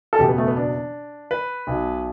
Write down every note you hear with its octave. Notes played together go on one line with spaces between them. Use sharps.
A4
F#1 E2 B2 G4
B3
A3
B3
D4
B4
B1 B2